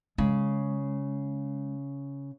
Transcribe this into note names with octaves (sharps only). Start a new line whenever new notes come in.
C#3 G#3